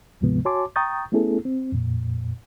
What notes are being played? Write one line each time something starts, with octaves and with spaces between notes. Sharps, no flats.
D2 G#2 C3 F3 G#3 B3
F#4 C#5 G#5 A5 C6 D6
G5 A#5 C#6 D#6 G6 A6
A3 B3 C#4 E4 G#4 A4
C4
F2 A#2